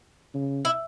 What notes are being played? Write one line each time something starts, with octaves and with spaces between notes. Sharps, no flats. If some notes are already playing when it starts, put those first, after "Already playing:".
C#3
E4